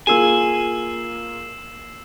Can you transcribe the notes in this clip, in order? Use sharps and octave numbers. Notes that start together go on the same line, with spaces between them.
A#3 F4 G#4 G#5 E6 C7 E7